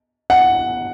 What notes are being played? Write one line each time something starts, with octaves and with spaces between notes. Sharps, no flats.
F#5